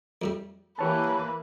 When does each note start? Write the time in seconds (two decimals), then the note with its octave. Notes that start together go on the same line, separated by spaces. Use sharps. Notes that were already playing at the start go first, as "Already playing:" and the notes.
0.22 F2 A2 G3
0.79 E3 A#3 G4 B4 C#5 A5